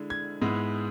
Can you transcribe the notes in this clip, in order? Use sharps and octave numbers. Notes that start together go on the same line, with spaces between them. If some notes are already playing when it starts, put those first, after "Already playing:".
Already playing: D3 G#3 E4
G#6
G#2 G#3 B3 E4